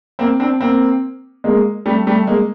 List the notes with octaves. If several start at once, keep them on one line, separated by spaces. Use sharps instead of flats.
A#3 C4
C4 D4
A#3 C4
G#3 A#3
G3 A3
G3 A3
G#3 A#3